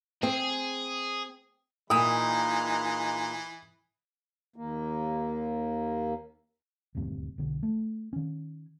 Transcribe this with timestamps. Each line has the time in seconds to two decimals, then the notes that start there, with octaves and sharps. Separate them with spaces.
0.23 C4 G#4
1.90 A#2 E3 G#3 A#3 D#4 G5 D#6
4.56 D#2 A#3
6.95 D#1 D2 G2 C3
7.38 B1 D3
7.63 A3
8.13 D#3 C#4